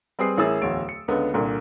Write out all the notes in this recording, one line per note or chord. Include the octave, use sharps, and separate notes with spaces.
G3 C4 G#4 B4 D#6 C7
A1 E4 G#4 A#4 E6 A6
D1 E2 C#5 D7
C#7
C#2 D3 B3
C2 A#2 D3